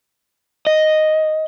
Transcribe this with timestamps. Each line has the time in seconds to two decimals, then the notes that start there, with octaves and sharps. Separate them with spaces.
0.67 D#5